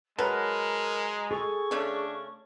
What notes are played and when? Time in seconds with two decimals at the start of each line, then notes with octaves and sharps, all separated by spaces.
0.19 F#3 G#3 A#4 B4 A5 A#5
1.31 G#4 A4 C#6
1.71 C#3 A3 C#4 D4